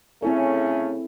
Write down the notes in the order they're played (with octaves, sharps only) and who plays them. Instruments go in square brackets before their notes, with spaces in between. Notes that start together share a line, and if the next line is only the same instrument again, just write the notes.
[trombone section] C#3 A3 C#4 [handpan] C4 E4 A4